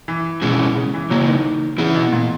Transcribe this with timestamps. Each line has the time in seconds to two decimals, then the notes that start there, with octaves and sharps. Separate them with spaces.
0.08 E3
0.42 B2 G#3 C#4 E4 G#4
0.76 C#3
0.94 E3
1.10 C#3 E3 F#3 A#3
1.28 D#3
1.78 C#3 E3 B3 E4
1.95 B2
2.13 A#2